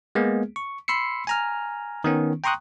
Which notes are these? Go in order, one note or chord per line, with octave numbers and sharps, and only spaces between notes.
G#3 A#3 B3 G#4
C#6
B5 C6 E6 C7 C#7
G#5 A#5 F6
D#3 B3 C#4
G5 A#5 C6 C#6 D#6 F#6